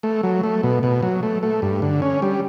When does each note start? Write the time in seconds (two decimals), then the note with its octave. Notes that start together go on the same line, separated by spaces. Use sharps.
0.03 A3
0.23 F#3
0.43 A3
0.63 B2
0.83 B2
1.03 F#3
1.23 A3
1.43 A3
1.62 G2
1.82 D3
2.02 C#4
2.22 G3